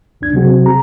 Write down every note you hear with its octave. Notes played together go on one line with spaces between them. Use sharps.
C#2 F#2 D4 G#6
C3 F#3 C4 F#4 G#4
A#5